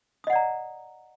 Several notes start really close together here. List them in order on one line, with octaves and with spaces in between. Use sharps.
D#6 D#5 F#5 D5 A#5